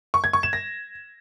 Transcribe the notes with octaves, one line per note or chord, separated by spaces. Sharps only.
C#6
G#6
C#6
E7
A#6